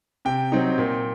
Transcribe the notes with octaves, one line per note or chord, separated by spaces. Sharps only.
C3 G5
F#3 C4 D#4
A#2